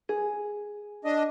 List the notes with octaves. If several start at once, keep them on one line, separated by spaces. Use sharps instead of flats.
G#4
D4 D#5